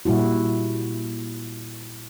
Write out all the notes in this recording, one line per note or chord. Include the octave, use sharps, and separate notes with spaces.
A#2 G3 E4 F#4